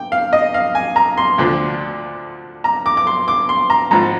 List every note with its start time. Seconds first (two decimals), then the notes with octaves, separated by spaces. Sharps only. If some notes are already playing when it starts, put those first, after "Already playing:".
Already playing: G5
0.12 F5
0.33 D#5
0.54 F5
0.75 G#5
0.96 A#5
1.18 C6
1.38 D2 D3 F3
2.64 A#5
2.86 D6
2.97 D6
3.07 C6
3.28 D6
3.49 C6
3.70 A#5
3.91 G#1 G#2 F3 A#5